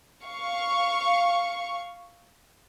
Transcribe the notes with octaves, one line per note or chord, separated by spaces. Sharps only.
F5 C#6